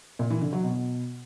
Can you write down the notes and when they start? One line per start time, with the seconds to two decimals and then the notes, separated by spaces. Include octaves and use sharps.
0.19 A#2
0.30 E3
0.42 D3
0.53 F#3
0.64 B2